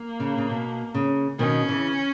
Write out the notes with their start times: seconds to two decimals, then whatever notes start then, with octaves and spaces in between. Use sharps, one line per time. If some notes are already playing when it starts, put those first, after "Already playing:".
Already playing: A#3
0.20 C#3
0.38 C#3
0.49 B2
0.94 C#3
1.39 B2 D#3 C#4
1.69 C#3 E3